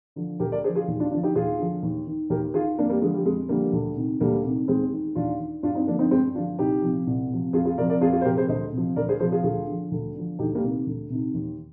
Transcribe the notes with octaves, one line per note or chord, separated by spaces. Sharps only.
D3 F3
D2 G4 A#4
A#4 D5
D3 F3 G#4 C5
F4 G#4
D#2
D4 F4
D3 F3 D4 F4
D#4 G4
D#2 F4 G#4
D3 F3
D#2
D#3
D#2 G4 A#4
D#3 F4 G#4
F2 A#3 D4
G3 A#3
D3 F3 G#3
G3
F2 G#3
D3 F3 G3 A#3
D2
C3 D#3
D2 G3 A#3
C3 D#3
D#2 G#3 C4
D#3
D#2 D4 F4
D#3
G2 D4 F4
C4 D#4
D3 F3 A#3 D4
C4 D#4
G2 G#3 C4
D3 F3 D4 F4
C2 D#4 G4
C3 F3
C2
C3 F3
F2 F4 G#4
F4 G#4
C3 F3 A#4 D5
A#4 D5
F2 F4 G#4
F4 G#4
C5
C3 F3 G4 A#4
G#4 C5
D2 C5 D#5
C3 F3
D2 A#4 D5
G#4 C5
C3 F3 G#4 C5
F4 G#4
D2 F4 G#4
D3 F3
D2
D3 F3
D2 D#4 G4
G3 A#3
C3 D#3
D2
C3 D#3
D#2